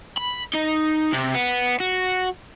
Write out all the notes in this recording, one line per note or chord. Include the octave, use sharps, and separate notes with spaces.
B5
D#4
C3
B3
F#4